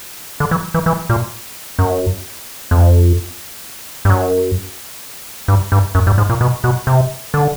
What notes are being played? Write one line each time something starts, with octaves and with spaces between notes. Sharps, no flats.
D3
E3
E3
E3
A#2
F#2
F2
G2
F#2
G2
G2
F#2
G2
G#2
A#2
B2
B2
C3
D3